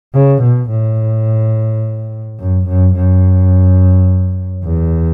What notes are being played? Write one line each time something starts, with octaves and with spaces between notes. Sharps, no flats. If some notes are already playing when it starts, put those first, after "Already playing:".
C#3
B2
A2
F#2
F#2
F#2
E2